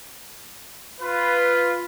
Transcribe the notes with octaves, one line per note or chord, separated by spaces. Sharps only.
F4 B4